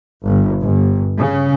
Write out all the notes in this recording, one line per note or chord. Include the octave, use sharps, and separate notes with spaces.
G1
G1
C#3